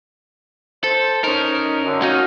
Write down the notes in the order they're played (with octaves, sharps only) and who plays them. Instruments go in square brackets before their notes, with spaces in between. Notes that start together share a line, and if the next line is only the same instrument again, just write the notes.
[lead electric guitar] A4 [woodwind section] C5
[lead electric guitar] C#4 A#4 [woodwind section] D#4
[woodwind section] F#2 D3
[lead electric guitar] C#4 D#4 [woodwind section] F#4 F5